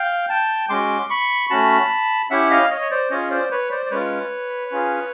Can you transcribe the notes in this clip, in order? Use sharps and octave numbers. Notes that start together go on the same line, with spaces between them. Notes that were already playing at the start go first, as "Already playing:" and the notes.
Already playing: F5 G5
G5 A5
G#3 C#4 F#4 C6 D6
B5 C#6
A3 C#4 F#4 A5 B5
C#4 E4 G4 E5 F#5
D#5 F5
C#5 D#5
C#5
C5 D5
C#4 F4 G#4 C#5 D#5
C5 D5
B4 C#5
C5 D5
D5
G#3 C#4 F4 B4 C#5
C#4 F4 G#4